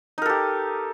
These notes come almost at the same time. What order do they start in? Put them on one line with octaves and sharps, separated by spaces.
D#4 A#4 A4 G4